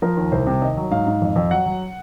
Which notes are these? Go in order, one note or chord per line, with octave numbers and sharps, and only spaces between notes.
F3 A#4
D#2
C2 C5
C3
D#2 D#5
F#3
G#2 F5
G#2
F2
F2
F#3 F#5
F#3